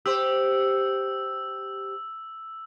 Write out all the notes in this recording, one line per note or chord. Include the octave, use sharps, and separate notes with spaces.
G4 C5 E6